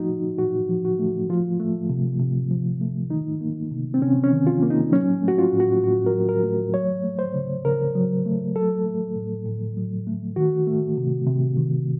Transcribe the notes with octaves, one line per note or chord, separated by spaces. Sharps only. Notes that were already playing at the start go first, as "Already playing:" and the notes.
Already playing: F3 A3 D#4 F#4
A#2
A#2 F#4
F3
F#4
A3
F3 F4
A3
C3
C3
F3
A3
D#3 D#4
A#3
C3
C4
C3 C#4
C#4
D#3
F4
A#3
D#4
F#3 C#4
A3
F#4
F4
A2
F#4
A2 F#4
A#4
F#3
A#4
A3
F#3 C#5
A3
C5
C#3
C#3 A#4
F#3
A3
F#3 A4
A3
A2
A2
F#3
A3
D#3 F#4
A3
C3
C3
D#3